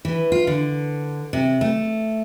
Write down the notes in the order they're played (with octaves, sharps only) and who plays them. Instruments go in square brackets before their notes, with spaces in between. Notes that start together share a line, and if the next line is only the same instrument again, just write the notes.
[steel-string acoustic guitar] E3
F4
D3
C3
A3